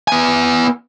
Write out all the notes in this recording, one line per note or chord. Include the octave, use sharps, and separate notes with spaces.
B3 G#5